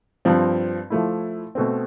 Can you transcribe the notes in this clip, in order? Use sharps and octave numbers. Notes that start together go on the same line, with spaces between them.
G2 F3 C4
F3 A3 E4
B2 A3 C4